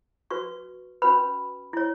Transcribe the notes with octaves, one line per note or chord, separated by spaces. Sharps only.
F#4 B4 C#6
C#4 F#4 B4 B5
E4 C#5